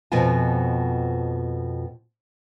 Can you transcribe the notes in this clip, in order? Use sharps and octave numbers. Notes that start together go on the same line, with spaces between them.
F2 B2 F3 B3 F4 G#5